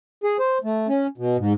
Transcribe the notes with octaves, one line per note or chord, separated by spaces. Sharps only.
G#4
C5
A3
C#4
B2
G#2